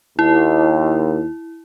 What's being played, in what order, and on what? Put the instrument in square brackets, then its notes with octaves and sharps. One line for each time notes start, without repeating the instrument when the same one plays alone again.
[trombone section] D#2 [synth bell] E4